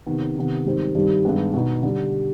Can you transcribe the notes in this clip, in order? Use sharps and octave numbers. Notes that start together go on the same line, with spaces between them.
C3 D#3 B3
C3 D#3 B3
G#2 D#3 G3 C4
G2 D#3 G3 C4 G4
G2 D#3 G#3 B3 D4
B2 B3 D#4
D3 G3